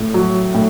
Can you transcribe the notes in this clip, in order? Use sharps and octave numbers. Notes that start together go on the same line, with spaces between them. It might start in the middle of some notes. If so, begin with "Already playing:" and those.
Already playing: A2
F#3
A2